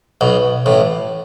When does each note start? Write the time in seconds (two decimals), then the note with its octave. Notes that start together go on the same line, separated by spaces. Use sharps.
0.21 B1 B2
0.66 A1 A2